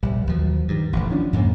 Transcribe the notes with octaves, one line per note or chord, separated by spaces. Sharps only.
A#1 G3
D#2 F3 F#3
G2 D#3
D#1 A1
F3 C#4 D4
F2 G#2 D3 A#3